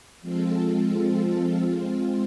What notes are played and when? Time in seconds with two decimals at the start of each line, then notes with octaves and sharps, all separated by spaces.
0.22 F3 G#3 C4 F4 A4
1.62 G#3 C4 F4